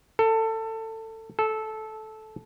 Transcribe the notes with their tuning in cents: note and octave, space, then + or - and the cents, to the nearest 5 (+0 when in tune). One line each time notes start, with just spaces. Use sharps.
A4 +20
A4 -15